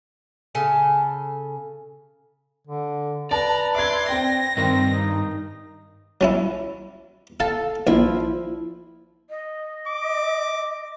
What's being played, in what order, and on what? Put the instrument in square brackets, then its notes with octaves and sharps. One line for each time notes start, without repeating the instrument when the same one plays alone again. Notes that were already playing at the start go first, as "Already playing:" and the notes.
[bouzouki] C#3 A4 G#5 A5
[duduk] D3
[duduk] B4 [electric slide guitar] D5 [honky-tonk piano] A5 [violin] A#5
[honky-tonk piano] E5 G#6 [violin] C6 D6
[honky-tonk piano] C4 G5 [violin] A#6
[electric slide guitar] G2 [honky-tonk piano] D#3 [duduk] C4
[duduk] D#4
[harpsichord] F#3 C#4 E4
[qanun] A4 [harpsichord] F5 A5
[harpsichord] A#1 [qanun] F3 E4
[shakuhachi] D#5
[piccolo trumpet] D6